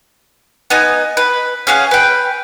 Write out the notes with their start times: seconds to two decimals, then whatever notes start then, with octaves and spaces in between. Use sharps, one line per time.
0.70 B3 D#4 G#5
1.17 B4
1.67 C#4 G#4 F5 F#5
1.91 B4 G5